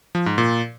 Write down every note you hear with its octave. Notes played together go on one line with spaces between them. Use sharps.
F3
G#2
A#2